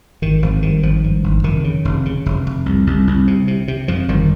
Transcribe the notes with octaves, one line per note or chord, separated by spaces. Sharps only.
G#1 D#3
G#1 F3
G2 D#3
G#1 F3
G2
G#1
F1 D#3
C#3
F1
C#3
F1
F1
C2
C2
C2
C3
C3
C3
F2 F3
G1 D#3 G3